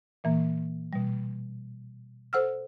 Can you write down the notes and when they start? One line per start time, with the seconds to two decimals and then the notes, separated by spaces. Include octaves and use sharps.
0.24 A#2 E3 A#3
0.93 B2 G3
2.33 A4 C5 F#5 E6 F6